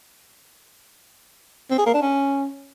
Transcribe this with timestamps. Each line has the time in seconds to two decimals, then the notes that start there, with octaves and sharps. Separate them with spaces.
1.70 C4
1.78 G#4
1.86 A#3
1.94 D4
2.02 C#4